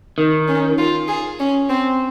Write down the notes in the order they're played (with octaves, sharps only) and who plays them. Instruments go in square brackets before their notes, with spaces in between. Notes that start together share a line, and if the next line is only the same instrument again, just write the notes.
[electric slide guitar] D#3
[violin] C#4
F4
G#4
C#4
C4